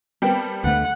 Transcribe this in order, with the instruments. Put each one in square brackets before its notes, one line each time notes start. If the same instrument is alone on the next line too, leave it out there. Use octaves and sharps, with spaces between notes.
[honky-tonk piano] G3 B3 C4 [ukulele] A#4 G5 A5
[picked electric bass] D2 A3 [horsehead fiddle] F#5